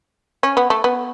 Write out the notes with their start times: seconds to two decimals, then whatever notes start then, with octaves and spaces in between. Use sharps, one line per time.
0.43 C#4
0.57 B3
0.70 A3
0.84 B3